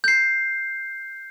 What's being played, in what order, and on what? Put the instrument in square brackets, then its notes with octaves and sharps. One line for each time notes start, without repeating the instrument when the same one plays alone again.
[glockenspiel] G6 C7